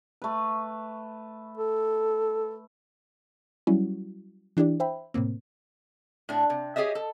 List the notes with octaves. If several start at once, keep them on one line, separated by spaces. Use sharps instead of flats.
A3 B4
A4
F#3 G3 C#4 E4 F#4
E3 D4 E4 G4 D5
C5 E5 G5 B5
A2 C3 A#3 C4
A2 D4
C3
G4 G#4 C#5 D#5 E5
A4